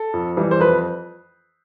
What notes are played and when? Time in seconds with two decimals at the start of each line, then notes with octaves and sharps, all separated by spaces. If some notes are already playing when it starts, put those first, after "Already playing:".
Already playing: A4
0.14 F2
0.37 E3 G3
0.51 C5
0.60 F2 B4